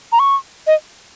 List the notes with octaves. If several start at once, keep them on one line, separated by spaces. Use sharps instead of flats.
A#5
C#6
D#5